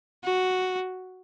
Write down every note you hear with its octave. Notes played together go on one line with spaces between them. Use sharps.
F#4